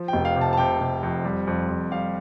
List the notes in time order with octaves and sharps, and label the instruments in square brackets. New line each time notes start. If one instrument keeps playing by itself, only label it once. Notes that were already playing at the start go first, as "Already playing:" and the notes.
Already playing: [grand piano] F3
G5
F1
F5
C3
A5
A5
C3 G5
C3
F2
G3
F2
F2
G3 F5